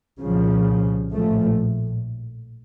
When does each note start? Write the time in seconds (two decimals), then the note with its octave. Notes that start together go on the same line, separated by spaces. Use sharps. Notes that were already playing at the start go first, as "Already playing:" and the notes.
0.19 C2 A#2 C#3 F3
1.12 A#1 A2 F3 A3